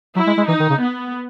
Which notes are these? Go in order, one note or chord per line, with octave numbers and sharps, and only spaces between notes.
F#3 E4
G#3
G#3
E3 D#4
D#3
C#3
B3